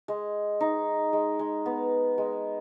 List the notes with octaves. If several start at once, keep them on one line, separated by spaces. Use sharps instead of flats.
G#3
D#4
G#3
G#3
B3
G#3